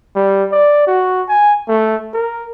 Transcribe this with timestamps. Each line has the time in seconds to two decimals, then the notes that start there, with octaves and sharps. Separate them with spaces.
0.15 G3
0.52 D5
0.87 F#4
1.28 G#5
1.68 A3
2.14 A#4